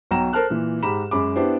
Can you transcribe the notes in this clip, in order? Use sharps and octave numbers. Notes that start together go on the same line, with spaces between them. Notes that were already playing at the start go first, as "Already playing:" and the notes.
B1 F#3 G5 A#5 E7
A4 A#4 C5 A5 F6 F#6
A#2 E3
G#2 G4 A#5 B5 E7
F#2 G#3 B5 D6
B3 D4 E4 G4 C5